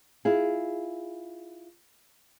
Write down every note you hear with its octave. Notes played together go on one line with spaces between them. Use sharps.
E4 F4 G#4